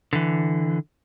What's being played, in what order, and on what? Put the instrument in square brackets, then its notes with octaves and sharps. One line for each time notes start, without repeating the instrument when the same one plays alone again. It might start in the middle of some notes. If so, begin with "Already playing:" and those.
[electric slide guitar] D3 E3